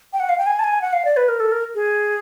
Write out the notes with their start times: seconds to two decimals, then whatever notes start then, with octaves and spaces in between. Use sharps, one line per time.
0.13 G5
0.20 F#5
0.29 F5
0.38 G5
0.46 G#5
0.59 A5
0.64 G#5
0.81 F#5
0.93 F5
1.05 D5
1.17 B4
1.28 A#4
1.40 A4
1.52 A#4
1.75 G#4